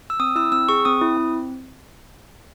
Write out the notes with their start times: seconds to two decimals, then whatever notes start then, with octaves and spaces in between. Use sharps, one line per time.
0.10 E6
0.19 C4 D#6
0.36 E4 E6
0.52 C4 E6
0.69 G#4 C#6
0.85 C4 D#6
1.01 E4
1.17 C4